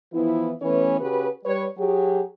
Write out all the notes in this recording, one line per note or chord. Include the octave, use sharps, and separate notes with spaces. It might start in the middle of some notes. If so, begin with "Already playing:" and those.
E3 F3 B3 E4
E3 A3 B3 C#4 B4 C#5
C#3 F#4 G4 B4
G3 B4 C#5
F#3 G4 G#4